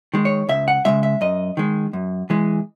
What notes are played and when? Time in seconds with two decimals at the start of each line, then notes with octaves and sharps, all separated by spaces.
0.14 D#3 G#3
0.25 C#5
0.49 C#2 E5
0.68 F#5
0.85 C#3 E3 G#3 E5
1.03 E5
1.21 F#2 D#5
1.57 D#3 G#3
1.93 F#2
2.30 E3 G#3